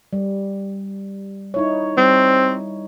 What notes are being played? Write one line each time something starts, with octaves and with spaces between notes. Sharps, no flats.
G3
D#4 E4 C#5
G3 C4